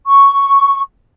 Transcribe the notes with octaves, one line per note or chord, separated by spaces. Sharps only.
C#6